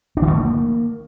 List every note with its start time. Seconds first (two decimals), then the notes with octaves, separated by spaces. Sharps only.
0.17 D4
0.22 D#3
0.27 D3
0.32 A3
0.37 A#3